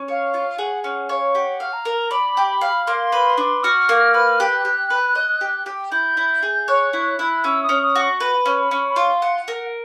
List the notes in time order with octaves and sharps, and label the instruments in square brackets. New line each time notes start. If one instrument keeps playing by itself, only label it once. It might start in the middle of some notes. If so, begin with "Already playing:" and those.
Already playing: [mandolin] C#4
[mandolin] C#5 [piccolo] F5
[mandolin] F4
[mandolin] G#4 [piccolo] F#5
[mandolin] C#4 [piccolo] F#5
[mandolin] C#5 [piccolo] F5
[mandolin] G4 [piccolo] F#5
[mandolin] F5
[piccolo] A#5
[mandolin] A#4
[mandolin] D5 [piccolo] B5
[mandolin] G4
F5
[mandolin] A#3 [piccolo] C6
[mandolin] B4
D4
[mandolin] F#4 [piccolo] F6
[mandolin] A#3
B4
[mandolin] G4 [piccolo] F#6
[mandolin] G4
B4
D#5
G4
G4
[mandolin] E4 [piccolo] G6
[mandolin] E4
G#4
[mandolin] C#5 [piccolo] F#6
[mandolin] E4
E4
[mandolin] C#4 [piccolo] E6
[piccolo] D#6
[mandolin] C#4
[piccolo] D#6
[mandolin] F#4
[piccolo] C#6
[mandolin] B4
C#4
[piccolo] B5
[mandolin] C#4
[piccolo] B5
[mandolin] F4 [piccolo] C6
[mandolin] F#5
A#4